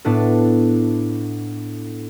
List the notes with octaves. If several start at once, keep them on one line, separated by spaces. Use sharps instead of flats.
A2 B3 D4 A4